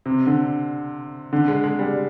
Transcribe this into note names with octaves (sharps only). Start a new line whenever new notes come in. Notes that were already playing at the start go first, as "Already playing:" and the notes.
C3
D3
D3
G#3
G#3
G3